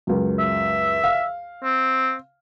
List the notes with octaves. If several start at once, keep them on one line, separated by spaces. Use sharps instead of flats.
C#2 F#2
E5
F5
C4